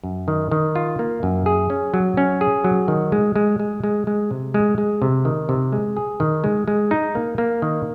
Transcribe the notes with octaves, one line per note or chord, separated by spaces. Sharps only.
F#2
D#3
D#3
F4
A#3
F#2
G#4
C#4
F#3
C#4
G#4
F#3
D#3
G#3
G#3
G#3
G#3
G#3
C3
G#3
G#3
C3
D#3
C3
G#3
G#4
D#3
G#3
G#3
D#4
A#3
A#3
D#3